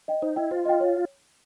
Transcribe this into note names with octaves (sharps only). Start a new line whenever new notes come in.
D#5 G5
D#4 C5
E4 D#5 G5
F4 C5
D#5 G5
C#5